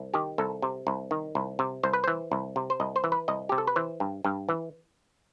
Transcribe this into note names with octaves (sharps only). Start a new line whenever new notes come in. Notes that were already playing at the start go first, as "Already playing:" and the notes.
Already playing: C2
D#3 G4
C2 A4
C3
C2
D#3
C2
C3
C2 C5
B4
E3 C5
C2
C3
C5
C2 D#5
C5
E3
B4
C2 D#5
C3 G4
A4
B4
E3 C5
G2
G2
E3